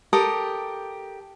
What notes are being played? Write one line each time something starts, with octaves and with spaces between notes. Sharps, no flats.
G4 A4 A#4 D#6